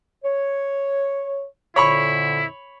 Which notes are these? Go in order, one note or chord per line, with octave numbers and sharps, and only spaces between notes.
C#5
F2 A#2 D3 E4 C#5 B5 C#6